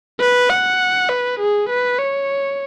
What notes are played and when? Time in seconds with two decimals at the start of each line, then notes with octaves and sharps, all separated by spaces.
0.20 B4
0.50 F#5
1.09 B4
1.39 G#4
1.69 B4
1.98 C#5